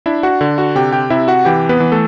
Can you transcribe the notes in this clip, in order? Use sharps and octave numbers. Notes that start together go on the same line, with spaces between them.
D4 E4 E5
F#4 F#5
D3
F#4 F#5
C3 G4 G5
G4 G5
C3 E4 E5
F#4 F#5
E3 G4 G5
B3 B4
E3
A3 A4